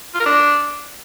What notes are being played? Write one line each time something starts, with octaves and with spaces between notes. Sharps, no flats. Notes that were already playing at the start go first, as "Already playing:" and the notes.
F4
A#4
D4